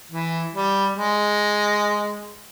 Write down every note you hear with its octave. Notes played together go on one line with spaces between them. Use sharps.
E3
G3
G#3